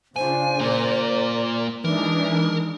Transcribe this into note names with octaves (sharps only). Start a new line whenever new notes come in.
C#3 D4 F4 C5 G#5
A#3 F4 A#4 D5
E3 G#3 D4 D#4 A#4